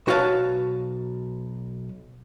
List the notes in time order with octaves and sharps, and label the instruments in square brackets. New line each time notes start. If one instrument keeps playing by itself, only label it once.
[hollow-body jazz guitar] B1 F#4 B4 C#5 F5 A5